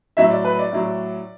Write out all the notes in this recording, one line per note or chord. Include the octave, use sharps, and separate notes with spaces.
A2 F#3 E5
D5
B4
D5
A2 F#3